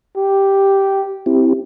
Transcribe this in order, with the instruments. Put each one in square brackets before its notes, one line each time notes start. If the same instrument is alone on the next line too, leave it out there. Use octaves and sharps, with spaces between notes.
[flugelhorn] G4
[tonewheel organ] C4 E4 G4